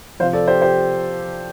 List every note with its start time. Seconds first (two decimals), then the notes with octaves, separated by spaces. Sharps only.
0.20 C3 F3 C5 F5
0.33 A4 D5
0.47 G4 C5
0.62 G4 C5